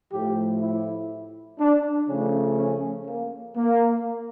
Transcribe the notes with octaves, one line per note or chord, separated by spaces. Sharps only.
A2 F3 A3 G4
E4
D4
C#3 F3 A3 C#4
C#4
A#3
A#3